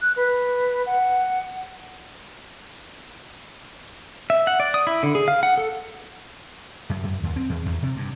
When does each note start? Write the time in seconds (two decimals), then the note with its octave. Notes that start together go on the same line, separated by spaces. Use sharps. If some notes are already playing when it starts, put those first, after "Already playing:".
0.01 F#6
0.16 B4
0.86 F#5
4.30 E5
4.47 F#5
4.60 D5
4.74 D#6
4.87 E4
5.03 D3
5.15 G#4
5.28 F5
5.43 F#5
5.58 A4
6.90 F#2
7.03 F#2
7.23 D#2
7.36 C4
7.50 E2
7.66 E2
7.83 C3
7.97 G2